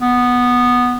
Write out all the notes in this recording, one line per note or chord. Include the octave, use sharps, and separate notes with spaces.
B3